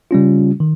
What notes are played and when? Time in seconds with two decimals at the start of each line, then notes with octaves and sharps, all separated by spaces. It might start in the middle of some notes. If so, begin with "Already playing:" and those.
0.11 C#3 G3 C#4 F4
0.60 D#3